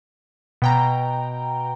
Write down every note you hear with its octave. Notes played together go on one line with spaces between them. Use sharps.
B2 G5 A#5